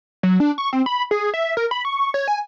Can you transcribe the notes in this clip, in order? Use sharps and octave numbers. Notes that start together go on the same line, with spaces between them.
F#3
D4
C#6
C4
B5
G#4
E5
A#4
B5
C#6
C#5
G#5